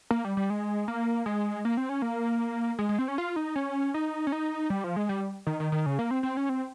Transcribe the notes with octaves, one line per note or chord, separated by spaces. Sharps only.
A#3
G3
G3
G#3
A#3
G#3
A#3
C4
C#4
A#3
G#3
G#3
C4
C#4
F4
D#4
C#4
D#4
C#4
D#4
G3
F3
G#3
G3
D#3
D#3
D#3
C#3
A#3
C4
C4
C#4
C4